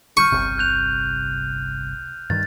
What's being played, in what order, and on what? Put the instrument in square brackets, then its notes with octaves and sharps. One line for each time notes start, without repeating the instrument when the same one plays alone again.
[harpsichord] C#6 [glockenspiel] F6 G6 D#7
[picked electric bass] G1 C2 C3
[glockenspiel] F#6 G6 F7
[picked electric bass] G2 D#3 [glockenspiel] A6